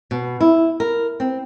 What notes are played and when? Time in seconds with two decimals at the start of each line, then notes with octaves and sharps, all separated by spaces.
0.11 B2
0.41 E4
0.80 A#4
1.20 C4